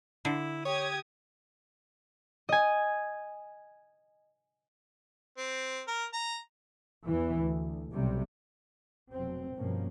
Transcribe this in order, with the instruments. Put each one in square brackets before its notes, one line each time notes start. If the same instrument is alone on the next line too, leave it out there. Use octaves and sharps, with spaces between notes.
[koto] D3 [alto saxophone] E4
[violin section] G4 D#6 G#6 [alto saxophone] C#5
[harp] D#5 G#5
[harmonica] C4
A#4
A#5
[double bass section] E2 E3
D2
B1 C3 G3
F1 B2 F#3 C4
G2 B2 F3 A#3 C#4